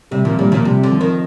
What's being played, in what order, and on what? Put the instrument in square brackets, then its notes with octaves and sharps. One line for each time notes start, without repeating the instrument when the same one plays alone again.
[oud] C3 [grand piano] G3
[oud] A#2 [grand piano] F3
[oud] A#2 [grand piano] G3
[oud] A#2 [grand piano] F3
[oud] C3 [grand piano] G3
[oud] D3
[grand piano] F3
[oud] D#3